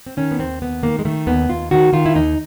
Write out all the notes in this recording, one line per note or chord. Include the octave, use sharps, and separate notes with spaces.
C4
D#3 C#4
B3
D#2 C4
D#2 B3
D#3 A#3
G#3
D#3 A3
D#2 B3
D#2 F4
D#3 F#4
D#3 F4
E4
D#2 D#4